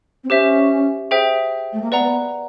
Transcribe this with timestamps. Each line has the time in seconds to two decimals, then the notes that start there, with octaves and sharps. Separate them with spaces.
0.24 C4
0.30 C#4 G4 C5 E5
1.11 G#4 C5 E5 G5
1.73 A3
1.81 A#3
1.92 B3 B4 D5 F#5 A#5